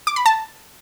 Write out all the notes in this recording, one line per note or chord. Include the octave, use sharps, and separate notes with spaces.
D6
B5
A5